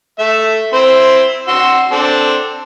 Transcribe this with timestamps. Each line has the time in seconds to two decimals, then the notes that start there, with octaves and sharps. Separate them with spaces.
0.19 A3 E5
0.73 C4 E4 C5
1.48 F#4 C6 E6
1.92 C4 D4 A4